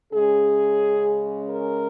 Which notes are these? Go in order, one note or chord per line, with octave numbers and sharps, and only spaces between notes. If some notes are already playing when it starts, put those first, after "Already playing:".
C#3 G#3 C#4 G#4
A#4